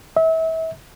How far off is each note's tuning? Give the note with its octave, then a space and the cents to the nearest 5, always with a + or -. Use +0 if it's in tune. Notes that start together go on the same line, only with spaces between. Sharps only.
E5 -30